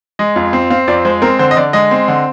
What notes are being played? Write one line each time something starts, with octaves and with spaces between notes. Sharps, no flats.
G#3 D#5
F2
C4
C4 F5
F2 D5
G#3 C5
C4 A#4
D3 C5
D#5
D3 D5
G#3 D#5
C4
D3